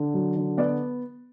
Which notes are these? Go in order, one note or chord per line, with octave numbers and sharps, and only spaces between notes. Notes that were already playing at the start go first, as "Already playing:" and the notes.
Already playing: D3
F#3
D3
B3 D5